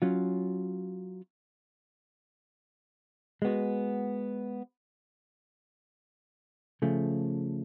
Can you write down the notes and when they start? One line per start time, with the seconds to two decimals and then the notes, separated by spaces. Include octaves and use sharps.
0.02 F#3 C#4 F4
3.42 G#3 B3 F#4
6.82 C#3 F3 A3